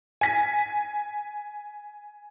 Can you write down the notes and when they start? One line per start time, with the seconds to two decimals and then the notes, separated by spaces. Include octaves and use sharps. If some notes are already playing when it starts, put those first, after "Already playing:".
0.21 G#5 B6